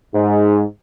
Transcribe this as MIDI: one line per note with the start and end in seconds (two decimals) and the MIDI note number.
0.14 0.62 44